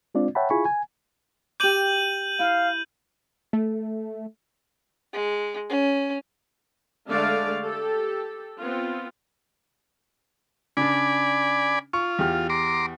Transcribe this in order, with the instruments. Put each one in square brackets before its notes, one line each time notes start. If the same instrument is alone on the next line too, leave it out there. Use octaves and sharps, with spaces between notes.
[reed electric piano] G#3 C4 D4 F4 D5
C#5 E5 F#5 G5 A5 B5
E4 F4 G#4 G#5 B5 C#6
G#5
[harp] G4 D6 [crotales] G6 D#7 F#7
[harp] E4 [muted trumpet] F5
[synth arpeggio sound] A3
[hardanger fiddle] G#3
C#4
[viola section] D3 G#3 A3 D5 F5
G4 A4
B3 C4 F4
[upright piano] C#3 D4 [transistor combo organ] D5 G#5 B5
[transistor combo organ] F4 [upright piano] C#6
[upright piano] E2 G4 F6
[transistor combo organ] A#5 C6 D6